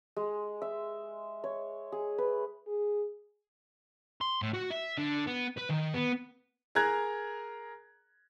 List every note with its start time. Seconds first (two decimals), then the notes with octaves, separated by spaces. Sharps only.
0.16 G#3
0.62 E5
1.44 C#5
1.92 G#4
2.18 B4
2.68 G#4
4.21 C6
4.42 A2
4.54 F#4
4.71 E5
4.98 D3
5.27 B3
5.57 B4
5.69 D#3
5.94 B3
6.75 G#4 A#4 A#5 F#6 G#6